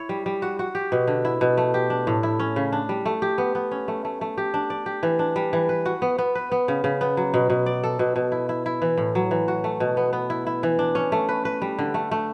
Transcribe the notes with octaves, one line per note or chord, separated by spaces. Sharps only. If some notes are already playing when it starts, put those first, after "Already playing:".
Already playing: E4 C#5
G3
G3
F#4
F#4
G4
B2
D3
E4
B2
A3
G4
D4
A2
E4
C#4
C#3
D4
G3
A3
G4
B3
B3
C#4
A3
A3
A3
G4
D4
D5
G4
E3
D4
G3
E3
B4
F#4
B3
B3
B4
B3
C#3
C#3
B3
F#3
B2
B2
D5
A4
B2
B2
E4
E4
E4
E3
A2
F#3
E3
F#4
A3
B2
B3
B3
E4
E4
E3
D4
C#4
A3
B4
B4
G3
D3
A3
A3